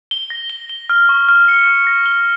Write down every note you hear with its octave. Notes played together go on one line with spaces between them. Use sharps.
G7
A#6
G7
G7
F6
C#6
F6
C#7
F6
A#6
G7